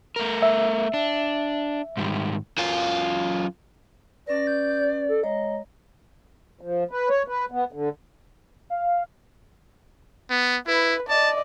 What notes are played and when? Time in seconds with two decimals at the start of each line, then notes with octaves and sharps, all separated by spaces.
0.16 A3 A#4
0.42 E5
0.94 D4
1.97 G#2 D#3 G3
2.58 F#2 F4
4.27 C#4 B4 D5 A#6
4.47 G6
5.09 A4
5.23 G#3 C#5 D#5 A#5
6.61 F3
6.91 B4
7.09 C#5
7.28 B4
7.52 B3
7.72 D3
8.70 F5
10.30 B3
10.67 E4 B4
11.09 D5 D#5 A5